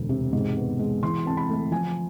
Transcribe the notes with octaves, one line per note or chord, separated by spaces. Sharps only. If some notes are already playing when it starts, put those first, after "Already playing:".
Already playing: E1 D2
C3
G#2
B3
G#3
E3 C6
C4 A5
B5
A3
F3 G#5